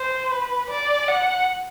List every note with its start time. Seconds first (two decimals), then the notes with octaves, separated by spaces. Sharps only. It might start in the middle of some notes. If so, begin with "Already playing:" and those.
Already playing: C5
0.31 B4
0.70 D5
1.08 F#5